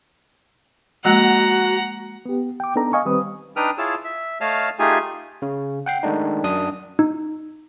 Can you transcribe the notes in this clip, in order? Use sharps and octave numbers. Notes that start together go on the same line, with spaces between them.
F3 G#3 A#3 F#4 F#5 A#5
B3 G4
G5 D6
B3 D4 D#4 A4 A#5
D#5 F5 G#5 C#6
D#3 G3 C4 B4 D#6
D4 D#4 B4 G5 D#6 F6
E4 F4 G#4 C#5 A5 E6
E5
A3 C#5 D#5 F5 A5 F6
A3 D#4 F4 G4 G#4 G#5
C#3
F#5 G5 C7
D#3 G#3 A3 D4 D#4
F#2 D4 D#6
D#4